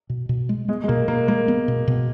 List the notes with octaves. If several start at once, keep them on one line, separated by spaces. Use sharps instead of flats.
B2
B2
G#3
G#3 B3
G#3
B2 A#3
B2 A#3
G#3 A#3
B3
B2
B2